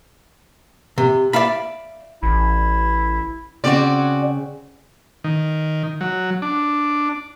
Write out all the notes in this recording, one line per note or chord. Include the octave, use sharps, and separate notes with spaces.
C3
D5 E5 F5 B5
A1 E4
C#3 C4 C#4 F#4 D5
D#3
F#3
D4